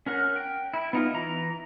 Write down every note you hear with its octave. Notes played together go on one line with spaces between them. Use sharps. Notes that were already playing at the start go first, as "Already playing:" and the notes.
C#4 A#4 F#5
G5
E4
B3 D#4 F4
E3 A#5